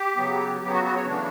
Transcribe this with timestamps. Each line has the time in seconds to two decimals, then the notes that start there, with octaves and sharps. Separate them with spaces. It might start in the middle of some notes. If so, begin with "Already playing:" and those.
Already playing: G4
0.16 C#3 F#3 B3
0.61 C#3 F#3 B3 G4
0.73 F#4
0.85 F#4
0.96 C#5
1.07 C#3 E3 A3 D4